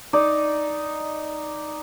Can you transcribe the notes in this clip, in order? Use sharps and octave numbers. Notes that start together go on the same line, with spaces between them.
D#4 D5